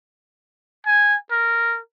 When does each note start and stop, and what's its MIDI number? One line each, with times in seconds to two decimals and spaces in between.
0.87 1.16 80
1.31 1.78 70